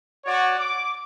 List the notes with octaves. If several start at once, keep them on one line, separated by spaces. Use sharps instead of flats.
F#4 C#5 D5
D6